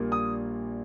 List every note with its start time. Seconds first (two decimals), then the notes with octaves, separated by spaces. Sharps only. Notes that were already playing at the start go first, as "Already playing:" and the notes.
Already playing: A#1 A#2 G3 A#3
0.12 D#6